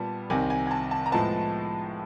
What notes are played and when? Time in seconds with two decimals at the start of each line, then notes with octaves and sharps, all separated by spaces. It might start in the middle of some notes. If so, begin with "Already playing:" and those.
Already playing: A#2 G3 B3 A5
0.30 C2 C3 D#3 G#5
0.50 G#5
0.67 G#5
0.71 A5
0.91 A5
1.06 A#5
1.12 A2 F3 G#3 B3 A5